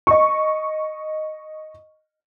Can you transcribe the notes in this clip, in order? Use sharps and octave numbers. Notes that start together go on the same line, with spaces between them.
D#5 C#6